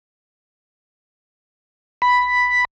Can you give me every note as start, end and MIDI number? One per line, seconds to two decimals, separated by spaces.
2.02 2.65 83